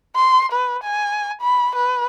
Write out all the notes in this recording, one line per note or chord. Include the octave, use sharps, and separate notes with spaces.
C6
B4
G#5
B5
B4